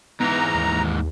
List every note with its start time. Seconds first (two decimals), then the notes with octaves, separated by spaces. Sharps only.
0.20 G#2 E3 B3 A#5
0.55 D#2